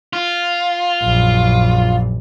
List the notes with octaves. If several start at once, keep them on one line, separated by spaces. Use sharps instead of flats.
F4
A#1 F#2